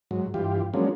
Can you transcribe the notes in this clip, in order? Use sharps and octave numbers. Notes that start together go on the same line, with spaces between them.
G#2 F#3
G2 E3 F4 G4
F3 F#3 G#3 A#3 C#4 D4